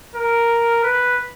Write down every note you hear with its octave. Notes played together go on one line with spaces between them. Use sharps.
A#4
B4